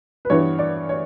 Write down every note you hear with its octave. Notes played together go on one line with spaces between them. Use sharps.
B4
G2 E3 B3 C#5
D5
C#5